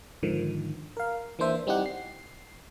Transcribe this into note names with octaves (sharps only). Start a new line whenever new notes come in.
G#2 D3 D#3 F3
A#4 F5
E3 A#3 D4 C5 E5
G3 C4 D#4 E4 G4 F#5
C7